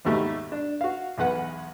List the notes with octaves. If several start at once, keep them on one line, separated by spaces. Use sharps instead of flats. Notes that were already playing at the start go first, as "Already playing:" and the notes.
D#2 G#2 B2 A3 G4 E5
D4
F#4 F5
B1 E2 B4 F#5